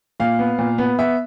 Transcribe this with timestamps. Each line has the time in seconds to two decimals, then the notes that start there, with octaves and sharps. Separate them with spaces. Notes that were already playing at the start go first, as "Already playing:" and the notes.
0.20 A#2 F5
0.39 B3
0.59 A#2
0.78 B3
0.99 B3 E5